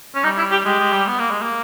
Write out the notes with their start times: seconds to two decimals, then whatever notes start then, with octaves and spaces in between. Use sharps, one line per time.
0.15 C#4
0.24 G3 D#4
0.38 E4
0.51 G4
0.65 G#3 G4
0.80 G#3
0.93 G3
1.07 B3
1.19 A#3
1.31 G#3
1.42 A#3